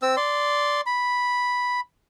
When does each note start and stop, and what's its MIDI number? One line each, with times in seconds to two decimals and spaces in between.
0.02 0.16 60
0.02 0.16 88
0.17 0.81 74
0.17 0.81 84
0.86 1.80 83